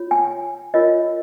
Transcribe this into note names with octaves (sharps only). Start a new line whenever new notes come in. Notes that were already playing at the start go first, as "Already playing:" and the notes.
Already playing: F4 C#5
G#5
F4 A#4 C#5 D#5